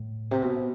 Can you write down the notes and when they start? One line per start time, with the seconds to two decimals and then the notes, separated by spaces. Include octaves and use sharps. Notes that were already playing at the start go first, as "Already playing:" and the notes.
Already playing: A2
0.31 C3
0.42 B2